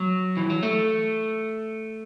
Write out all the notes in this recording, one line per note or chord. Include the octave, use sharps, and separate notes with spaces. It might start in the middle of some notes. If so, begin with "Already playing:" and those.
Already playing: F#3
E3
F#3
A3